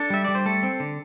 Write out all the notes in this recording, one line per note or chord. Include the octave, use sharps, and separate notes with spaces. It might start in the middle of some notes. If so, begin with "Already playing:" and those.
Already playing: D4 A4
G3 E5
G3 D5
C5
A3 A4
C4
D3